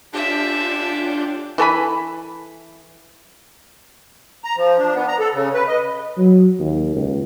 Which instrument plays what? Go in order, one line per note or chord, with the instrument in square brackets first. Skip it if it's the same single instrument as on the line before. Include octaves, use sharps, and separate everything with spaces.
[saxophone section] D3 C#4 G4 [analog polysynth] D4 F4 G6 [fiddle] E5
[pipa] E3 A4 G#5 B5
[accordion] A#5
F3
D4
B3
A#5
A4
C#3
B4
D#5
[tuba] F#3
D#2
C#2